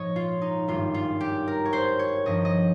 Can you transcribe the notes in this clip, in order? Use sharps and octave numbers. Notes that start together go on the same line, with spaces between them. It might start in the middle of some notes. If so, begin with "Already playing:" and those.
Already playing: A#1 G#2 F3 C#5 D#5
F4
D#4
G#1 G2 G3 F4
F4
G4
A#4
C#5
C5
C#5
G1 G2 F3 D#5
D#5